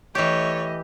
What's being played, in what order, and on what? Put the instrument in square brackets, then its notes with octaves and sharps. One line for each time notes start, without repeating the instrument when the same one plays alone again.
[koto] E3 G4 [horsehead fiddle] A3 D#5 [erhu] C#5